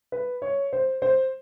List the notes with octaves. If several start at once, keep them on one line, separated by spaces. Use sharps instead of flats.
B4
C#5
C5
C5